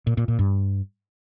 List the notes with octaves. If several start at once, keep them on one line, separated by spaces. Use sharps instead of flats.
A#2
A#2
A#2
G2